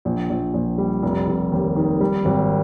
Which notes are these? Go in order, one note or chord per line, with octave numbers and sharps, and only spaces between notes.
A#1
A#1
A#1
G3
F1
F1
D#2
D#3
G3
G#1